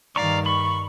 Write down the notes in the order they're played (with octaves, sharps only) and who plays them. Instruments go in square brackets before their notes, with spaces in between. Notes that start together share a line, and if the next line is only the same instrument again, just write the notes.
[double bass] G2 D#3 [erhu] D5 [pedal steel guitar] F5 A#5 C#6
[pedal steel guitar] B5 [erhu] C#6